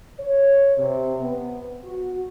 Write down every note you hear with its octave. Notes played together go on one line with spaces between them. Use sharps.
C#5
C3
B3
F#4